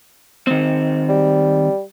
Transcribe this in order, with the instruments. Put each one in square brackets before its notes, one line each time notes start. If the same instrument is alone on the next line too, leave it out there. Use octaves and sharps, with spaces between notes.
[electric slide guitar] D#3 C4
[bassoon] G3